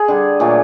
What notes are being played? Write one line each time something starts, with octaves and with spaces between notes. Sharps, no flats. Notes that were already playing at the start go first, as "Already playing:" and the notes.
Already playing: G#4
D3 G3
A#2 F#3 A3 G#4